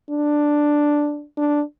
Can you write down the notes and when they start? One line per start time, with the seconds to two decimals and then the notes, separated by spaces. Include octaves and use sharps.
0.10 D4
1.38 D4